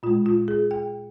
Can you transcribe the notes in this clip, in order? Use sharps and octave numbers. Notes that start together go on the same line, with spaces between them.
A#2 G#3 F4
F4
G#4
G5